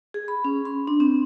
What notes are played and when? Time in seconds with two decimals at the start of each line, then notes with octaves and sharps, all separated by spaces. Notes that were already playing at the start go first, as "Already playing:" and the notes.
0.14 G#4
0.28 B5
0.45 C#4
0.65 C6
0.87 D4
1.00 C4